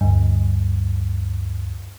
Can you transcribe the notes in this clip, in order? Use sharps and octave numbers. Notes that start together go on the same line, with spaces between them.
D2 G2